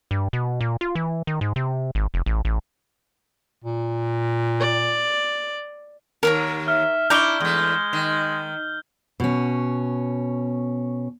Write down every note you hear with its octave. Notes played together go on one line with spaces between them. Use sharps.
G2
B2
A#2
F4
E3
D#3
G#2
C3
G#1
F1
A1
A1
A#2
D5
D#2 A#4 C#5 A#5
E5 F6
D4 E4 A#5 C#6 D6 G6 G7
E2 G#3 A3
D#3
B2 C#4